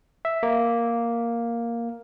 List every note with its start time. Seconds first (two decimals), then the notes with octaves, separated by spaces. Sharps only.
0.25 E5
0.43 A#3